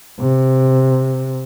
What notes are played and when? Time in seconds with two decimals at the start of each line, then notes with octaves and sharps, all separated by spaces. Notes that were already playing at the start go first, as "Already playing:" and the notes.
0.20 C3